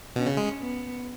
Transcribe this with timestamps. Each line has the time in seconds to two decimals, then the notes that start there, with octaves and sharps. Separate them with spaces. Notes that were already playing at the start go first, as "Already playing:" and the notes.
0.16 B2 C#4
0.26 C#3
0.37 G#3
0.60 B3